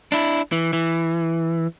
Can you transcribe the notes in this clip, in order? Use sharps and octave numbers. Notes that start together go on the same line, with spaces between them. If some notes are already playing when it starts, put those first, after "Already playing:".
D4 E4
E3
E3